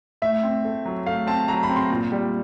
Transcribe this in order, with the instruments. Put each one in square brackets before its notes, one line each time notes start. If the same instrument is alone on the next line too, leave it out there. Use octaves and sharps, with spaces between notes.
[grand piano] A2 E5
C4
A3
F#3
A3 F5
C4 A5
F#3 A#5
B5
C4
C6
A#2
G3